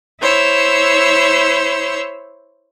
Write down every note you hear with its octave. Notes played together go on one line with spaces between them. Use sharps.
E4 C5 C#5 E6